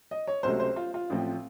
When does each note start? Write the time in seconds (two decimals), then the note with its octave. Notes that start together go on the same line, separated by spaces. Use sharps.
0.11 D#5
0.27 C#5
0.43 C#2 C3 F#3 A3 C5
0.60 C5
0.76 F4
0.94 F4
1.10 A1 A2 F3 C4